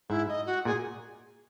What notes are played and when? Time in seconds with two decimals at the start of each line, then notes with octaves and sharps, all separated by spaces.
0.09 G#2 E4
0.28 D#5
0.46 F#4
0.65 A#2 G#4